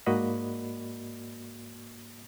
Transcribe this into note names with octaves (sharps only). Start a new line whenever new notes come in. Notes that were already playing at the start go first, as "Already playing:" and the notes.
G#2 A#3 F#4 D5 D#5 B5